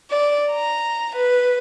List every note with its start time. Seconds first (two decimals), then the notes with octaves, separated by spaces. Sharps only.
0.11 D5
0.52 A#5
1.16 B4